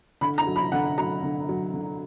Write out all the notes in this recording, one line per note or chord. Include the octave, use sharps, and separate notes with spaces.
D3 B5
A#5
F#3
B5
D3 F#5
F#3 A#5
D3
F#3
D3